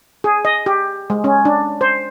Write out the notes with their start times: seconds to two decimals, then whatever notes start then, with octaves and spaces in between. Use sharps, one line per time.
0.24 G#4
0.45 D#5
0.66 G4
1.10 G#3
1.24 C#4
1.45 D4
1.81 C5